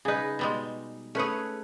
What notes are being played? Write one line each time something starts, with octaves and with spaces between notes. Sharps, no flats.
C#3 D#4 G#4 B4
B2 G3 G#3
A3 C#4 G#4 B4 C#5